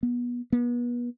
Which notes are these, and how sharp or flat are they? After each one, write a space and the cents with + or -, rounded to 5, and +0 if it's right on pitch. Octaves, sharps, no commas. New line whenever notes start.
B3 -25
B3 -35